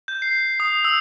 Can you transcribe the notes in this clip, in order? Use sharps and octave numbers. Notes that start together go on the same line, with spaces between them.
G6
C7
D#6
E6